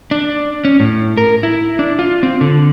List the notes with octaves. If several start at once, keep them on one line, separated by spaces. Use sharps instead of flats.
D4
C#4
A2
A#4
E4
D4
F4
C4
D3